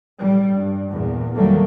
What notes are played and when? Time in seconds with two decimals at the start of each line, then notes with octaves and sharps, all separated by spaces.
0.19 A1 G3
0.51 G2
0.90 E2 A#2
1.35 D#3 E3 F#3 G3 A3 A#3